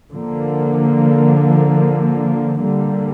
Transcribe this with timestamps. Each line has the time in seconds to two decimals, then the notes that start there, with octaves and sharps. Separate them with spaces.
0.11 D3 F3 A#3
2.59 D3 G3 A#3